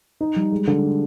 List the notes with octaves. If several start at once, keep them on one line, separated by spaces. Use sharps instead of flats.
D#4
G3
G#3
D3